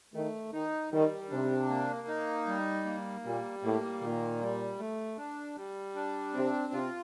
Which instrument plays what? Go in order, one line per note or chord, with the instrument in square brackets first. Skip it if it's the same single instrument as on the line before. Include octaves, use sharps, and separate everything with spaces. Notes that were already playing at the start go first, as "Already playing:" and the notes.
[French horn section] D#3 [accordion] A3
[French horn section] D#3 [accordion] D#4
[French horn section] D#3 [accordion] G3
[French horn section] C3 [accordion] D4
[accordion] A#3
D#4
G3
A#3
[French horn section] A#2 [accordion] G3
[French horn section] A2 [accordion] A#3
[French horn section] A#2 [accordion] D#3
[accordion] G3
A3
D4
G3
D4
[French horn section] C3 [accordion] C4
[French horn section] C3 [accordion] F4